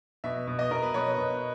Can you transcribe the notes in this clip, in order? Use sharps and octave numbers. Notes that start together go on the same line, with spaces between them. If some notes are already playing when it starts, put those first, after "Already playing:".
B2 E5
B2
D#5
B2 A#4
B4
B2 C#5
B2